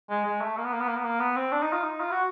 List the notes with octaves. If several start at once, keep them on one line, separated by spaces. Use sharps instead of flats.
G#3
G#3
A3
A#3
B3
A#3
B3
A#3
B3
A#3
B3
C4
D4
D#4
F4
D#4
F4
F#4